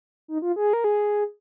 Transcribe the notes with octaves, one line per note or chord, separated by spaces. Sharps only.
D#4
F4
G#4
A#4
G#4